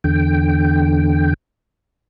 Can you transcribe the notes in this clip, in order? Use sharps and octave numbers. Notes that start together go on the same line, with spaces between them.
E2 D3 G5